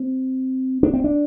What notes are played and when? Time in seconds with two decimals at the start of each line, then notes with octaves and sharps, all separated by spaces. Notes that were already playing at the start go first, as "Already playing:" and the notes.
Already playing: C4
0.83 D4
0.93 C4
1.04 D4